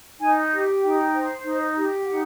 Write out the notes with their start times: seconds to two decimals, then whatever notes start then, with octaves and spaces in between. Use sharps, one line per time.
0.19 D#4 G#5
0.51 G4
0.82 D#4 G5
1.13 C5
1.44 D#4
1.75 G4
2.06 D#4 F#5